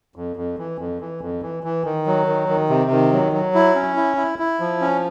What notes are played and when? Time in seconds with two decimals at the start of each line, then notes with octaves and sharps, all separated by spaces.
0.16 F2
0.36 F2
0.58 E3
0.79 F2
1.00 E3
1.21 F2
1.42 E3
1.63 E3
1.85 D#3
2.06 F#3
2.27 D#3
2.49 D#3
2.69 C3
2.91 D#3
3.12 F#3
3.32 F#3
3.55 E4
3.75 C#4
3.96 E4
4.17 E4
4.39 E4
4.60 F3
4.81 C#4